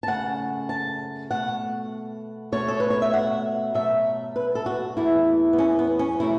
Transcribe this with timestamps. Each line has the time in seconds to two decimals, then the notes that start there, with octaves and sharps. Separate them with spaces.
0.03 A5
0.07 F#2 C#3 A3 F#5
0.69 A5
1.30 B2 A3 F#5
2.52 B2 A3 C#5
2.68 A4
2.80 B4
2.90 C#5
3.02 E5
3.13 F#5
3.74 B2 F#3 A3 E5
4.36 B4
4.55 A4
4.66 F#4
4.97 E2 E3 A3 E4
5.53 B3
5.58 C#4
5.79 B3
5.99 C#4
6.19 B2 F#3 A3 E4